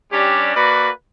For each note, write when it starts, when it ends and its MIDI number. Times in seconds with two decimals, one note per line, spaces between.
0.12 0.54 55
0.12 0.54 61
0.12 0.54 62
0.12 0.54 67
0.55 0.89 58
0.55 0.89 66
0.55 0.89 71
0.55 0.89 74